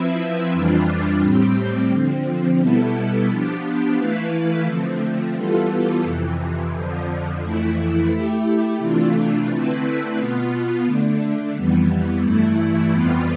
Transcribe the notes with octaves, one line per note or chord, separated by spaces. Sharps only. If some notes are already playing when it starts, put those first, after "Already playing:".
Already playing: F3 C4 E4 B4 E5
F2 E3 G3 D4 F4
A2 G3 C4 G4
D3 F3 C4
B2 G3 B3 E4 A4
F3 B3 D4 G4
E3 A3 E4 B4 F5
D3 F3 A3 C4
E3 G3 B3 F4 A4
F2 C3 E3
F2 D3 F3
F2 E3 A3 E4
A3 E4 G4
C3 E3 A3 D4 F4
D3 A3 C4 E4 B4
B2 B3 F4
D3 A3 D4
F2 E3 G3 B3
G2 E3 A3 E4
F2 E3 G3 B3 F4